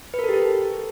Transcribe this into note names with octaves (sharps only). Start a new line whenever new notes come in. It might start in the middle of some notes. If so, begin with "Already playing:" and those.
B4
A#4
A4
G4
A4